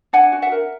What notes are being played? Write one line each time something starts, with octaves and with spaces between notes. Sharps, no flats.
D4 F#5 G#5
F#4
E5 F#5
A#4